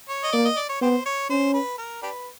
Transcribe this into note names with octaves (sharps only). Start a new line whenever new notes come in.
C#5
D#5
A#3 D5
D#5
D5
C#5
B3 G4 C5
C#5
C#4 C5
B4
A#4
D4 G4 B4